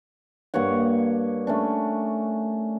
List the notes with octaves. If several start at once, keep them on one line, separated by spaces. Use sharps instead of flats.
G2 A#3 C#5 F#5
A3 C#4 D4